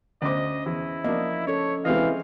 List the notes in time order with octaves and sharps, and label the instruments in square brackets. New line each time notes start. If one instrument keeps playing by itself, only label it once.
[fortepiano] D2 D6 [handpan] C#4 C5 [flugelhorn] D#5
[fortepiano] E2 [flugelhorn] E4
[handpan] F3 D#5 [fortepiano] A#3 D4
[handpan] C#4 A4 [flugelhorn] C#5
[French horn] E3 [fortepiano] G#3 C4 D#5 [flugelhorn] F5